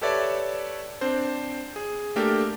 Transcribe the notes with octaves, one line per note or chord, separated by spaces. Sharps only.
G4 A4 B4 C#5 D5 E5
C4 D4 C5
G#4
A3 A#3 D4 G4 A4 A#4